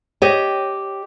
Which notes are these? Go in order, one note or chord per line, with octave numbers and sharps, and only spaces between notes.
G4 C#5 D#5 G5